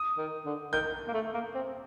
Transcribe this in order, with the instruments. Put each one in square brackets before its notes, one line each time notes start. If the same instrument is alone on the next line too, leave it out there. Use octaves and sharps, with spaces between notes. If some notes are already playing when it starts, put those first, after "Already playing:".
Already playing: [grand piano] D#6
[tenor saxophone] D#3
D3
[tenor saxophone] D#3 [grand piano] G6
[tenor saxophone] A#3
A3
A#3
C4